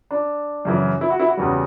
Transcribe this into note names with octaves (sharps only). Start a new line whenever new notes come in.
D4
F#2 C#3 E3
E4
F#4
E4
F#4
E2 C#3 G3